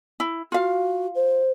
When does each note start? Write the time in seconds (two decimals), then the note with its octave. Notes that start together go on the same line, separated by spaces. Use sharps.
0.20 E4
0.52 F4 F#4 F5
1.15 C5